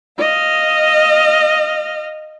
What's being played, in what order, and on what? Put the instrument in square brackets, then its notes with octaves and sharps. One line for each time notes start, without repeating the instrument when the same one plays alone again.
[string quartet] D#5 F5 F6